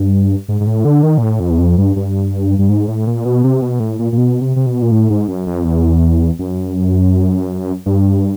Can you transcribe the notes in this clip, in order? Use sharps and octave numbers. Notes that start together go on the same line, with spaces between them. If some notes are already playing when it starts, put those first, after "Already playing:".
Already playing: G2
G#2
G#2
A2
D3
D#3
A#2
A2
F2
E2
F2
G2
G2
G2
G#2
A2
A#2
B2
C3
B2
A2
A#2
A#2
B2
C3
C3
B2
A#2
A2
G#2
F#2
F2
E2
F#2
G2